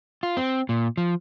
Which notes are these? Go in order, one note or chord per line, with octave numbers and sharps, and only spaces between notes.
F4
C4
A#2
F3